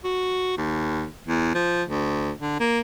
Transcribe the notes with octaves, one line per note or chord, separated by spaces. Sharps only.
F#4
D#2
E2
F3
D2
D3
A#3